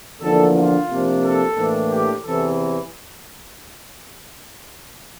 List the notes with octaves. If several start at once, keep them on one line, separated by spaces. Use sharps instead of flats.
E2 D3 F3 A#3 D4 A4
F4
C3 F3 A#3 D4
A4
A2 E3 A#3 D4
G4
E2 C3 E3 A4